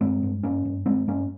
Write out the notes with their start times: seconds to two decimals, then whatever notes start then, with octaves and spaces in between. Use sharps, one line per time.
0.01 G2 G#3 C4
0.23 G2
0.43 G2 A#3 C#4
0.65 G2
0.86 G2 G#3 C4
1.08 G2 A#3 C#4